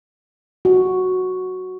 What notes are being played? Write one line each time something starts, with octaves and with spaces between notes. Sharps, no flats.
F#4